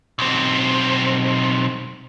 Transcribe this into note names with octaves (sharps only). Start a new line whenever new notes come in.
B1 C4